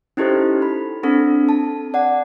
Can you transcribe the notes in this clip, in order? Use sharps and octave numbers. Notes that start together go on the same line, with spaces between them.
C#4 D#4 E4 G4 A4 C5
B5
C4 D4 A4
A5
D5 F#5